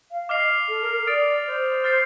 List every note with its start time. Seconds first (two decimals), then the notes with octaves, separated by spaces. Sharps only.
0.11 F5
0.29 D#5 D6 F6 C7 F7
0.68 A4
0.81 A#4
0.94 A#4
1.07 D5 D#6 A6 D7
1.46 C5
1.84 F6 A6 C7